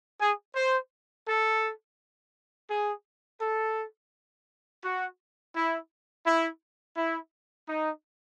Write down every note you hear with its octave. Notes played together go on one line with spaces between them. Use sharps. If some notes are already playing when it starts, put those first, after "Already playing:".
G#4
C5
A4
G#4
A4
F#4
E4
E4
E4
D#4